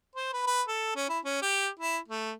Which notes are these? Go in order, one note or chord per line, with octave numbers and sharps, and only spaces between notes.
C5
B4
B4
A4
C#4
E4
C#4
G4
E4
A3